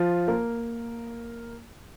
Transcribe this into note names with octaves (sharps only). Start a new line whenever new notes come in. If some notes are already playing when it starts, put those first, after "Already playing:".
Already playing: F3 F4
A#3 A#4